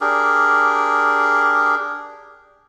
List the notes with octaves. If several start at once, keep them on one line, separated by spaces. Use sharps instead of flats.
D4 G4 G#4 A#4